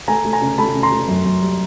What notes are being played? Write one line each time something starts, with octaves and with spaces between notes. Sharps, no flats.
A3 G#5 A#5
A3
G#5 A#5
C#3
A3 A5 B5
C#3
A#5 C6
A3
F#2
F#2
G3